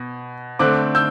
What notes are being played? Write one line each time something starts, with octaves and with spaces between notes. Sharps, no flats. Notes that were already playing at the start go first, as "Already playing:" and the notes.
Already playing: B2
D3 A3 C4 D6 F#6
E6 G6